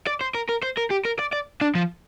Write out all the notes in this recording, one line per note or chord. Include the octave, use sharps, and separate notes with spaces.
D5
C5
A#4
A#4
C5
A#4
G4
A#4
D5
D5
D4
F3